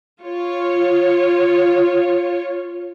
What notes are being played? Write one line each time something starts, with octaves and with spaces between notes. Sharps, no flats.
F4 C#5